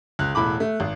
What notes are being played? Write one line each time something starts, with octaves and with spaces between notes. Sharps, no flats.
C#2 F#6
E1 A2 B5 D6
A3
G#1